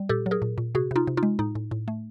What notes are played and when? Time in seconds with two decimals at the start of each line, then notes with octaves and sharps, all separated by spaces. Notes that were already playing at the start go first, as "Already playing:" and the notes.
Already playing: G3
0.09 A#2 G4 A4
0.26 F#3
0.31 G#4 A#4
0.42 A#2
0.58 A#2
0.75 C3 F#4 G#4
0.91 C3 D#4 F4
1.07 C3
1.17 D#4 F4
1.23 G#3
1.39 A2 D#4
1.55 A2
1.71 A2
1.88 A3